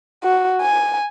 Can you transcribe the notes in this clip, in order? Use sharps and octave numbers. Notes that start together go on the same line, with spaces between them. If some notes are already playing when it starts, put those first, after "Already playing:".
F#4
G#5